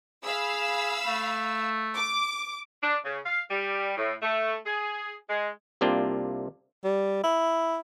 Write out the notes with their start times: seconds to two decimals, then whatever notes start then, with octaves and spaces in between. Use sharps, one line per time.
0.24 G#4 F5 B5 E6
1.06 A3
1.95 D6
2.83 D4
3.05 C#3
3.26 F5
3.50 G3
3.97 A2
4.22 A3
4.66 G#4
5.29 G#3
5.81 C2 C3 A#3 D4 F4 G5
6.84 G3
7.23 E4